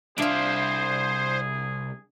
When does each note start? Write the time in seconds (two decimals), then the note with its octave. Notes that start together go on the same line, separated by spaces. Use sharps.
0.18 C2 D4 F4 G#4 C5 E5